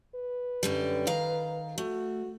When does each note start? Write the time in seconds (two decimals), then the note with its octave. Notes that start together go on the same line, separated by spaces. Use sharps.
0.15 B4
0.63 F#2 D3 G3
1.07 D#3 F5 A#5
1.78 A3 F#4